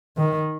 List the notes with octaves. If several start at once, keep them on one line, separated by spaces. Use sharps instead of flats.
D#3